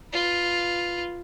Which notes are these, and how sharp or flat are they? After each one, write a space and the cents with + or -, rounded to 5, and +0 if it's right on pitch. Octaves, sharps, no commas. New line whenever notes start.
F4 +0 B4 +0